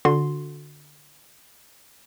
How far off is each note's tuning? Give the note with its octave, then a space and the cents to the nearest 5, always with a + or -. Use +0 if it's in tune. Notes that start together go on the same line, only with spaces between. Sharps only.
D3 +0 F#4 -30 C6 +0